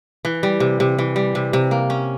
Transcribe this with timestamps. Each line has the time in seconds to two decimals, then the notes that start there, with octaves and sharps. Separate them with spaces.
0.25 E3
0.43 G3
0.60 C3
0.80 C3
0.99 E3
1.16 G3
1.35 C3
1.53 C3
1.71 A#3
1.90 C#4